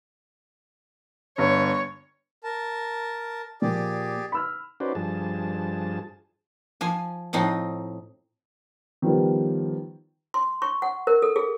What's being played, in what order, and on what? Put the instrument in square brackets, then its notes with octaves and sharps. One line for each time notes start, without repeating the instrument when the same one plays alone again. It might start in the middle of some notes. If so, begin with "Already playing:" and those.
[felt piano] G1 [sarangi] C#5
[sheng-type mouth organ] A#4 A5
[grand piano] A#2 F3 [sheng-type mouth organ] G4 G#4 D5
[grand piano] B5 E6 F6
[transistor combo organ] C#4 D#4 F#4 B4 C5 D5
G2 F3 G#4 A5
[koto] F3 G#5
A2 F3 C4 D#4
[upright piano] D#3 F3 G3 B3
[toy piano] C6
C#6
F#5
A#4
A4
G#4